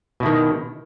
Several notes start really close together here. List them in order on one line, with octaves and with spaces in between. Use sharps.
B2 E4 D#3